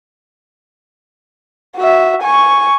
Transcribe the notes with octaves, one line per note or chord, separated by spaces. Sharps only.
F#4 E5
G#5 C#6